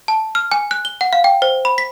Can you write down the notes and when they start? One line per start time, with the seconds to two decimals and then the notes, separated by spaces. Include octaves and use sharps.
0.08 A5
0.35 F6
0.52 G#5
0.71 F#6
0.85 G7
1.01 F#5
1.13 F5
1.24 G5
1.42 C5
1.65 B5
1.78 B6